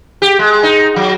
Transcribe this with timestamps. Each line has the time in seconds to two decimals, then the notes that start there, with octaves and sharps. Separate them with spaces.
0.22 G4
0.39 G#3
0.63 D#4
0.96 F#3